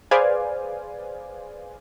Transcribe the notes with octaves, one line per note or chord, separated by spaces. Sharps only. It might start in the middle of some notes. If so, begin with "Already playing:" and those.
G#4 B4 C5 D5 F5 G#5